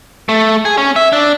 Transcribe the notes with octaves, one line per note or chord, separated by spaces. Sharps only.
A3
G#4
C#4
E5
D4